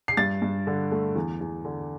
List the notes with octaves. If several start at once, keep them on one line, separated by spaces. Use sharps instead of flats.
C7
G2 A6
G2
D3
A3
E2
E2
D3